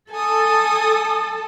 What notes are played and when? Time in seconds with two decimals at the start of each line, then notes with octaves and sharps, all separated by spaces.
0.11 A4 G#5 D#6